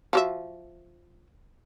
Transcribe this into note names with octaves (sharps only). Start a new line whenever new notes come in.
F3 F#4 E5